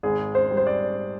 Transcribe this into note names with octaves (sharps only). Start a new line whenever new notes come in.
G#1 G#4
C5
G3
C5
D5